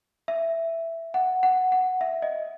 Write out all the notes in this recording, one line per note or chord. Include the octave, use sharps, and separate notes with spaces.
E5
F#5
F#5
F#5
E5
D#5